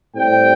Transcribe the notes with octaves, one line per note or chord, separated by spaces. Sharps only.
A2 G3 C4 G5